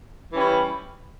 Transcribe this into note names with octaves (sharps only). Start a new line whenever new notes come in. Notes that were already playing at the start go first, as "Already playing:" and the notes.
E3 G3 C#4 E4